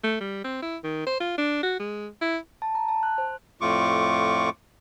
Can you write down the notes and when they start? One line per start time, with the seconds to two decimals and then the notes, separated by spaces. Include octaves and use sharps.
0.04 A3
0.20 G3
0.44 C4
0.62 E4
0.84 D#3
1.07 C5
1.20 F4
1.38 D4
1.63 F#4
1.79 G#3
2.21 E4
2.62 A5
2.75 A#5
2.88 A5
3.03 F#6
3.18 C5
3.61 F2 A2 A3 F4 C#6 D6